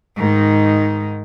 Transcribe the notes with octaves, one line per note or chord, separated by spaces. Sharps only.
G#2 D#3